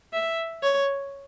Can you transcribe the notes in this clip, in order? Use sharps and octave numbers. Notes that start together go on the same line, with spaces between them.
E5
C#5